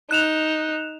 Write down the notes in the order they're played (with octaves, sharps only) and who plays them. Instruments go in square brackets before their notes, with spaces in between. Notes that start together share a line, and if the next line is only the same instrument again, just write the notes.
[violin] D#4 [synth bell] F#6 E7 F7